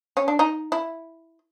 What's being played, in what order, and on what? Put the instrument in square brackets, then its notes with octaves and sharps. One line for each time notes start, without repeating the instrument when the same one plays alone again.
[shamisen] C#4
D4
D#4
E4